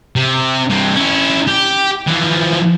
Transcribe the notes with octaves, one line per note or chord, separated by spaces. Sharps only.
C3
G2 C4
C#4 E4
G4
E3 F3